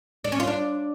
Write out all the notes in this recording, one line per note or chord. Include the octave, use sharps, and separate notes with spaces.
D4
C#4
F4
D4